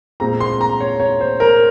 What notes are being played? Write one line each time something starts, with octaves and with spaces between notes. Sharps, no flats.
A#2 G#3 C4 A#5
C6
A#5
C#5
C#5
C5
A#4